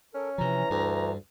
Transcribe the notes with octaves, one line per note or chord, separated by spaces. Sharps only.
C#4 A4 A#4
C3 E3 F3 A#5
D2 G2